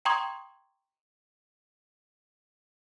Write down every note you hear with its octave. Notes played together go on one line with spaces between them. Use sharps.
G5 A#5 C6 C#6 D#6 G#6